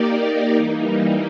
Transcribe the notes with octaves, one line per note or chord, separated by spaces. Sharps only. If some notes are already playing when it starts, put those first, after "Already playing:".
Already playing: A#3 D#4 G4 A#4 D5
E3 G3 A#3 D#4